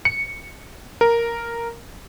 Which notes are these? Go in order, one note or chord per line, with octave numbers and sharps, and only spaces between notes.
C#7
A#4